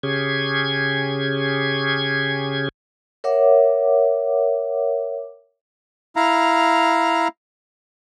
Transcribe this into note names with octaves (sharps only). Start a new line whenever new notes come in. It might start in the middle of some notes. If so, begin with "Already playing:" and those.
C#3 C#4 G4 G#4 G#6
A#4 C#5 E5 F#5 D6
E4 F5 A#5